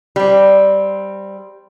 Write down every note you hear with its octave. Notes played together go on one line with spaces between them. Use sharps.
G3 C4